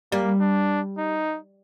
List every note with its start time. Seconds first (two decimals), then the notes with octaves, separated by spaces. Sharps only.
0.12 G3 A#3
0.40 D4
0.98 D#4